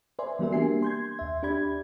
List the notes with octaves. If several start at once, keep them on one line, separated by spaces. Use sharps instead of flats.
B4 C5 D5 E5 G#5 C6
E3 G3 B3 F#4 A#4 E5
A#3 D4 G4 G#5 C7
C6 G6 G#6
D#2 E5
D4 G4 D5 B5 G#6